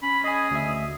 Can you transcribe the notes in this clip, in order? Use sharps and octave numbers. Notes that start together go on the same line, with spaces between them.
C#4 B5
G#4 D#5 G#5 D#6
D2 E5